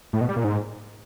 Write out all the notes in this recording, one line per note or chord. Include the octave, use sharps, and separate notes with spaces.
A2
B2
G3
A#2
G#2